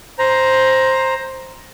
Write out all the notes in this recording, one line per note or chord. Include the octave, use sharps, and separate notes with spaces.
C5 A#5